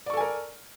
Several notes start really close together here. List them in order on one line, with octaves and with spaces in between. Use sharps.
D5 C#6 A4 G#5 A#4